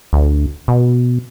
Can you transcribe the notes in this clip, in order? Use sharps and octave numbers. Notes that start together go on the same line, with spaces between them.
D2
B2